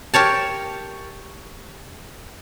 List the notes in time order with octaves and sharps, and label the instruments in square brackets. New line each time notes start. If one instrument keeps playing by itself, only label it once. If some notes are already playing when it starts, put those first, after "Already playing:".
[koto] G4 A#4 C#5 A5